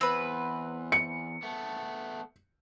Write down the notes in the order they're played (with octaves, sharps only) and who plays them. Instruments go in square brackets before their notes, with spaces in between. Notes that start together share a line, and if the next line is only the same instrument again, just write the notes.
[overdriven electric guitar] E2 [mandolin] C4 B4
[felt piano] C#7
[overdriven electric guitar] A3 B3